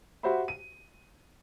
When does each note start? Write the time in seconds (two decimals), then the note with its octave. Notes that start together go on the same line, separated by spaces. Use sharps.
0.23 F#4 G4 C5 E5 B5
0.48 D#7